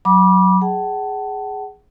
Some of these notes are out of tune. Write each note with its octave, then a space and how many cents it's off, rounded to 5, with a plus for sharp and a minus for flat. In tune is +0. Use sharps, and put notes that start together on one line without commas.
F#3 +0 B5 -25 D6 +0
G#4 +0 F#5 +35 A5 +0